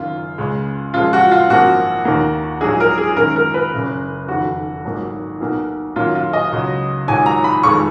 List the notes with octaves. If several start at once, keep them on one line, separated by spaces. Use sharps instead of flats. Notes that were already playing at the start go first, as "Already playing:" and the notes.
Already playing: F#1 F#2 D#3 F4
C#2 C#3 G#3
F#2 F3 G#3 F4
F#4
F4
G#1 F#2 F3 A#3 F#4
D#2 D#3 A#3
A#1 G#2 F#3 G#4
A#4
G#4
F#2 D#3 G#3 A#4
A#4
B4
F#1 F#2 C#3
F1 F2 D#3 F#4
G#1 G#2 F#3 A#3
B1 B2 A#3
F#2 D#3 F#3 A#3 F4
F4
D#5
C#2 C#3 F#3
G#1 G#2 F#3 G#5
A#5
B5
F1 F2 D#3 G#3 C#6